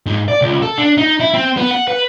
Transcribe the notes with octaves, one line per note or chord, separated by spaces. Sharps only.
G#2
D5
C#2
A4
D4
D#4
E4
C4
B3
F#5
B4